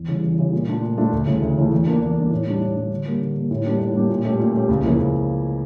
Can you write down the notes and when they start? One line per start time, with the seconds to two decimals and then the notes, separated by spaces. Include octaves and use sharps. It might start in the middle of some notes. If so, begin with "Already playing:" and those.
Already playing: E2
0.08 C#3 E3 G3
0.23 E2
0.39 C#3 E3 G3
0.53 A#2
0.67 A3 D4 F4
0.83 A#2
0.98 A3 D4 F4
1.12 D2
1.27 C#3 E3 A3
1.42 D2
1.57 C#3 E3 A3
1.71 E2
1.87 E3 A#3 D4
2.01 E2
2.16 E3 A#3 D4
2.31 A2
2.47 G3 D4
2.60 A2
2.76 G3 D4
2.90 D3
3.06 G3 A#3
3.20 D3
3.35 G3 A#3
3.51 A2
3.65 G3 A#3 D4 G4
3.79 A2
3.94 G3 A#3 D4 G4
4.09 A#2
4.25 A3 C#4 G4
4.40 A#2
4.54 A3 C#4 G4
4.69 C#2
4.84 C#3 F3 A#3 E4
4.99 C#2